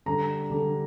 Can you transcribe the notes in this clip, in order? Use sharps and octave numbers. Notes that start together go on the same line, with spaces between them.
D3 G3 D4 A#5
D3 G3 D4